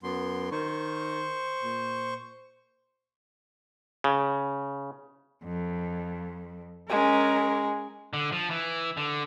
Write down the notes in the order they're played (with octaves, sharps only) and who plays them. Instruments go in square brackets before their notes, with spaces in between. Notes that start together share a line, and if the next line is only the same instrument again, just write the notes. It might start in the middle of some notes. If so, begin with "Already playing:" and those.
[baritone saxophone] F#2 [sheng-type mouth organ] B3 C6
[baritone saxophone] D#3 [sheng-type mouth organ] C5 C#6
[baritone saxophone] A#2
[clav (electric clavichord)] C#3
[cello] F2
[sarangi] G#3 [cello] C#4 A#4
[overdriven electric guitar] D3
F3
E3
D3